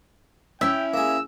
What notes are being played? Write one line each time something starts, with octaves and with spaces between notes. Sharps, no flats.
C#4 E4 E5 G5
A#3 G#4 E6